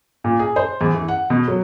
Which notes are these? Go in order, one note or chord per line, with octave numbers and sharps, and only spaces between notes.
A#2
G#4
C5
E2
E3
F#5
B2
F#3